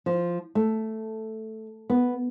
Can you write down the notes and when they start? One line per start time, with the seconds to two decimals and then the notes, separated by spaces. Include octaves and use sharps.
0.06 F3
0.55 A3
1.90 B3